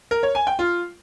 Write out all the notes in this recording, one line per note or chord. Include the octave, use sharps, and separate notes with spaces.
A#4
C#5
G#5
G5
F4